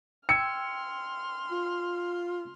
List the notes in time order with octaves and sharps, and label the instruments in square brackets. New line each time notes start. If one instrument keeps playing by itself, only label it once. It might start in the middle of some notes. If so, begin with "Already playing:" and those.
[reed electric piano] G5 E6 G#6 [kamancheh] C6 F6 [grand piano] C#7
[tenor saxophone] F4